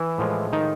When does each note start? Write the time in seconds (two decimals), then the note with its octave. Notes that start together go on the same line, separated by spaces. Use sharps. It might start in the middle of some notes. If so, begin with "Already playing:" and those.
Already playing: E3 E4
0.18 A2 F3 G#3
0.53 D#3 D#4